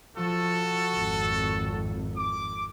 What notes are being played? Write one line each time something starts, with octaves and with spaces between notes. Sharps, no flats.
F3 F#4 A4
G#1 F2
D6